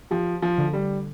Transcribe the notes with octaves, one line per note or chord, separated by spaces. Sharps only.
F3 G4
F3
D3
G3